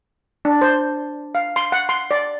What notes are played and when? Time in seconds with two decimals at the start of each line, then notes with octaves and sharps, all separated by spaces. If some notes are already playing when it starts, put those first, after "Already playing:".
0.45 D4
0.61 C5
1.35 F5
1.56 C6
1.72 F#5
1.89 C6
2.11 D5